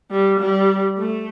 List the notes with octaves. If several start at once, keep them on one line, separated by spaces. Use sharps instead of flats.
G3
G3
A3